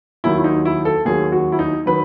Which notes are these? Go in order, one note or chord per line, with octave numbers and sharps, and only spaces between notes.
D#2 D#3 F#3 E4
E4
D#4
E4
A4
D#2 D#3 F#3 G#4
F#4
E4
D#4
D#3 F#3 B4